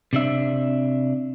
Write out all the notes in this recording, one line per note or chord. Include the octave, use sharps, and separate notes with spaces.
C3 D4 E5